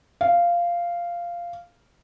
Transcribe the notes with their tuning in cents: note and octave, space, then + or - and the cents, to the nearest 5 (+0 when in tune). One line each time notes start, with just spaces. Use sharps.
F5 -10